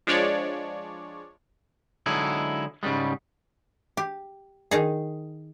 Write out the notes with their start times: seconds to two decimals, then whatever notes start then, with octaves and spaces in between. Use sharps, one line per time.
0.07 F3 G#3 D4 C#5 D5
2.06 D3 F#3 G#3 D#4 E4
2.83 G#2 C#3 E3 G3 G#3
3.97 G4
4.71 D#3 D#4 G#4